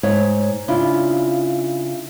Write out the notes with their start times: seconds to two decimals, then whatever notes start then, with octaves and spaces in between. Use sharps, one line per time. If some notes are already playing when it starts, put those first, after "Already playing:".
0.03 G#2 C#5 F#5
0.68 C#3 D4 E4 F4